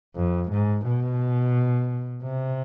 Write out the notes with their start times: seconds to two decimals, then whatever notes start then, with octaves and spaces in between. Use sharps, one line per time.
0.16 F2
0.51 G#2
0.85 B2
2.23 C3